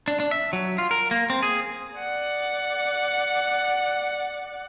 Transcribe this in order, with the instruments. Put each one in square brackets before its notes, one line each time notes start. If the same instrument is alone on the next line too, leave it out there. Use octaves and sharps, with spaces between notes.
[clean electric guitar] D4
D4
E5
F#3
F4
A#4
A#3
C4
G#4
[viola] D5 F#5